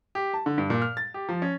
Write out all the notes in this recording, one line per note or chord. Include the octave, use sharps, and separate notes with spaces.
G4
A5
D3
G2
A#2
F6
A6
G4
F3
C#4